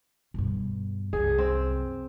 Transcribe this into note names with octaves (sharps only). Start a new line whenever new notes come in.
G2 B2
C2 F#2 G#4
C4